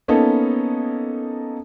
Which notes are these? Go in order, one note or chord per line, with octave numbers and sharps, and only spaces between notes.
A#3 B3 C#4 D#4 A4